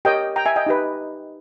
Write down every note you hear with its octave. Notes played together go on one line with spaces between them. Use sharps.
G4 A#4 C#5 D#5 G5
G5 A#5
E5 G#5
D#5 G5
D#4 G4 B4